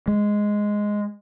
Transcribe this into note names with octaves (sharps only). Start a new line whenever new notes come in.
G#3